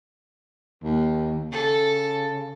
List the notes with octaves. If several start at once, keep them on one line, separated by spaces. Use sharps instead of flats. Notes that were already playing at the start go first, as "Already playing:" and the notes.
D#2
C#3 A4